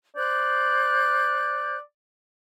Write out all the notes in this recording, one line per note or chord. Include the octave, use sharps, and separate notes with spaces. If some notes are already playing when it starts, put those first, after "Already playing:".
C5 D5 F#6 G6